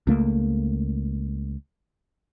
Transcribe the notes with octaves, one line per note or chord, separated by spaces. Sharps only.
C#2 A3 A#3